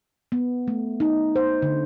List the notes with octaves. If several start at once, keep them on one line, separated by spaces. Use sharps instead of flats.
B3
A3
D#4
C5
D3